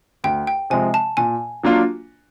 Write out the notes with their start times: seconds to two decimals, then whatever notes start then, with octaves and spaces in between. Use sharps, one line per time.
0.24 D2 G5
0.47 G5
0.70 C3 F3 G#3 G#5
0.94 A5
1.17 A#2 G#5
1.64 F#3 A#3 D4 F4